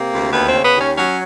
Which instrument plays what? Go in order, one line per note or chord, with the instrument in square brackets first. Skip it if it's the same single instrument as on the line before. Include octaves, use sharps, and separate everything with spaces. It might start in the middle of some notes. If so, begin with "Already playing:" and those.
Already playing: [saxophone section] C3 A#3
D2
D#2 B3
C4
C#3
B3
D#2 C#4
F#3 C#4